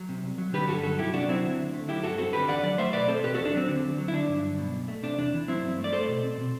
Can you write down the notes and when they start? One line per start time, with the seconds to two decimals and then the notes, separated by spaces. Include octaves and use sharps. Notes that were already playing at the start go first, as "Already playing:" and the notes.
Already playing: F#3
0.09 C3
0.24 C2
0.38 F#3
0.53 D3 G4 B4
0.68 G2 F#4 A4
0.83 F#3 F#4 A4
0.99 C3 E4 G4
1.13 C2 D4 F#4
1.28 F#3 C4 E4
1.44 D3
1.59 D2
1.74 A3
1.88 F#3 E4 G4
2.03 G2 F#4 A4
2.18 C4 F#4 A4
2.33 D3 G4 B4
2.48 E2 D5 F#5
2.63 F#3 D5 F#5
2.78 A3 C5 E5
2.93 B2 B4 D5
3.08 C4 A4 C5
3.23 B2 G4 B4
3.34 F#4 A4
3.39 E2
3.45 D4
3.53 F#3 C4
3.69 D3
3.83 D2
3.98 F#3
4.08 E4
4.13 D3 D4
4.29 G2
4.43 F#3
4.58 B2
4.73 B1
4.88 A3
5.03 C3 D4
5.18 E2 D4
5.34 E3
5.48 F#3 C4 E4
5.63 G2
5.78 A3
5.84 D5
5.93 A3 A4 C5
6.08 B2
6.23 C4
6.38 B2